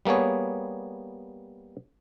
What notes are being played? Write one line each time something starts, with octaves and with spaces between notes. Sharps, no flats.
G3 A#3 B3 G#4 C#5